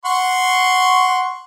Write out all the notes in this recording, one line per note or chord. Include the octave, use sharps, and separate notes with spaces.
F#5 C6 C#6